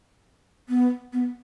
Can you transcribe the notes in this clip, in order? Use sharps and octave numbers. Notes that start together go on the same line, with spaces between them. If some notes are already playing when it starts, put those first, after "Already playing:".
B3
B3